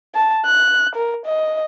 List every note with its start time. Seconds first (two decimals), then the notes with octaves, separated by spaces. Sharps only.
0.15 A5
0.46 F#6
0.95 A#4
1.25 D#5